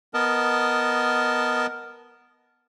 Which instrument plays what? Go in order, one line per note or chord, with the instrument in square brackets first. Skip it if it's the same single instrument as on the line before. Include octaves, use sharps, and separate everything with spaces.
[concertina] B3 A#4 D#5 A5